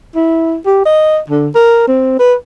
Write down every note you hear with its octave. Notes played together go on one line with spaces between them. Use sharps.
E4
G4
D#5
D3
A#4
C4
B4